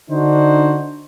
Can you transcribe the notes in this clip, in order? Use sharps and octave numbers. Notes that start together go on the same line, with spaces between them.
D3 D4 D#4 F#4 C5